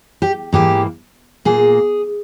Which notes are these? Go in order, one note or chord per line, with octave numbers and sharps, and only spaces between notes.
G4
G#2 E3 A#3 G4
A#2 A#3 G#4